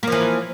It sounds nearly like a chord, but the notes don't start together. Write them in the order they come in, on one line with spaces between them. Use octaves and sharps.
A#3 F3 E3